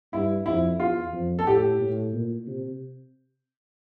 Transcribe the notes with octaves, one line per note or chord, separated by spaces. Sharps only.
G2 E4
F2 E4
E2 F4
F2
A4
A2 G4
A2
A#2
C3